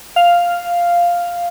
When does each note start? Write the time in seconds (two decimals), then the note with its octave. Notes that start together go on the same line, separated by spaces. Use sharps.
0.16 F5